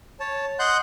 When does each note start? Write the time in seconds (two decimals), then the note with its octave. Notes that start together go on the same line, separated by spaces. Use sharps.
0.20 C#5 A5
0.59 D#5 F#5 C6 F#6 G6